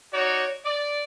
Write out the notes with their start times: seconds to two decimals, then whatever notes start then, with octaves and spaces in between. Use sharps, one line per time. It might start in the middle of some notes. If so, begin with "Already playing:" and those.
0.13 D#4 F#4 C#5 D5
0.65 D5